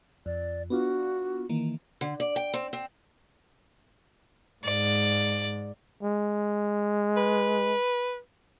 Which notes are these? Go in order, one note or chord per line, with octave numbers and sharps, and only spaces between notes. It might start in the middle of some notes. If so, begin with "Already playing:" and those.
F2 D5
B3 D4 F4 F#4
D#3 E3 A#3
D3
D5
G5
C4
C4
G#2 D5
G#3
B4